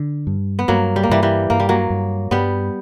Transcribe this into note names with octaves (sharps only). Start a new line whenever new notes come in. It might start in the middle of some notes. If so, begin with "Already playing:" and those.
Already playing: D3
G2
B3
G2 F#3 A#3
G3
A#3
G2 E3 G3
E3 G3
G2 A#3
G3
F#3 A#3
G2
G2 G3 B3